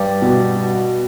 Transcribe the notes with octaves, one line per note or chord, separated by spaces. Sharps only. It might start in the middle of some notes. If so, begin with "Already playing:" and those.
Already playing: G2 G3
B2